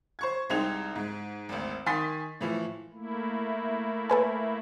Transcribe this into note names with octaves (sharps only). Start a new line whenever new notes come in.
C5 C#6 G#6
C2 G#3 C4 D#4 G#6 F7
G#2
G#1 D2
D#3 G#5 C6 D#6 A6 B6
A2 E3 F3
A3 A#3 E4
A4 B4 G#5